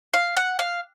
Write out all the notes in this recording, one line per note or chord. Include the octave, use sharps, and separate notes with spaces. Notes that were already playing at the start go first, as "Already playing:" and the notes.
F5
F#5
F5